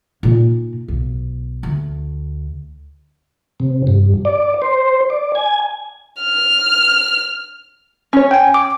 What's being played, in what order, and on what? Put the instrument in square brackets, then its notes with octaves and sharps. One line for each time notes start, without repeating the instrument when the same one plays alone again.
[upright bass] A#2 D#4
B1
D2
[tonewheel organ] C3
G2
D5
C5
D5
G#5
[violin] F6
[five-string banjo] C#4 C#5
[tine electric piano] G5 G#5
D6